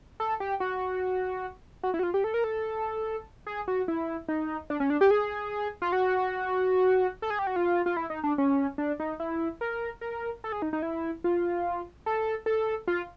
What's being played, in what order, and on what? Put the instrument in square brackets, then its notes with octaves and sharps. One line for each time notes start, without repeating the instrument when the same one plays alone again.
[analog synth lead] A4
G4
F#4
F#4
E4
F#4
F4
G4
A4
A#4
A4
G#4
F#4
E4
D#4
D4
C#4
D4
G4
G#4
F4
F#4
A4
G#4
G4
F#4
F4
F4
E4
D#4
D4
C#4
D4
D#4
E4
A#4
A#4
A4
G#4
D#4
D#4
E4
F4
A4
A4
F4